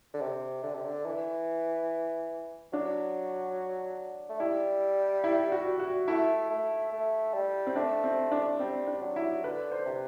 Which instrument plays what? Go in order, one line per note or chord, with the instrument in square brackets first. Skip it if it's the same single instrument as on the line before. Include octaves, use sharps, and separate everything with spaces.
[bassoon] D3
C3
D3
C3
D3
E3
[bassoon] F#3 [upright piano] D4
[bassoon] A3
[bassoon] G3 [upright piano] E4
[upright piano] E4
F#4
F#4
[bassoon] A3 [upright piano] E4
[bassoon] A3
A3
G3
[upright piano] C4
[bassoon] A3 [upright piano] D4
[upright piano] C4
D4
[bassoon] G3 [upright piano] C4
[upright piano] D4
[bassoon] F#3
[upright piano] E4
[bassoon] D3 [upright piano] B4
[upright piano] C5
[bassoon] C3